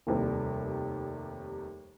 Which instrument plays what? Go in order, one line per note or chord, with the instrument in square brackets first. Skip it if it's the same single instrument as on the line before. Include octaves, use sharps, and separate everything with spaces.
[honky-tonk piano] F1 D#2 C3 G3